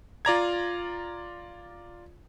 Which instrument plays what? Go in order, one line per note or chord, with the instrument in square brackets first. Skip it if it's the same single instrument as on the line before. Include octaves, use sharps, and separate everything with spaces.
[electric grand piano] F4 D5 A#5 G#6